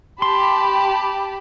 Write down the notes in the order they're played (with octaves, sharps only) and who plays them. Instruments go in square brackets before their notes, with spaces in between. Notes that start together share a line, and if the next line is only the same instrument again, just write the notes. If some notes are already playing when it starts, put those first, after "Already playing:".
[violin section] G4 A5 B5 [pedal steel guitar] C6